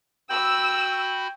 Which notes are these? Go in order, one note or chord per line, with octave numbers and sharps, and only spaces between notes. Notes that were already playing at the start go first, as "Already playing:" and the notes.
F#4 G5 B5 E6